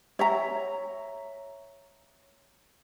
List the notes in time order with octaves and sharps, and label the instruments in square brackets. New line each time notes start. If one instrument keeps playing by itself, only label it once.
[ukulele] C#5 E5 A#5